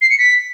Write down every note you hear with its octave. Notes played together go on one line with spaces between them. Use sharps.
C7
C#7
B6